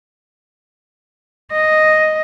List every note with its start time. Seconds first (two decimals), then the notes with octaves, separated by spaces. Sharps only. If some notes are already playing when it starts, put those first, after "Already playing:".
1.53 D#5